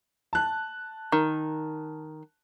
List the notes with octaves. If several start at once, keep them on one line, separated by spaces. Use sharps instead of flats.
A5 F#6
D#3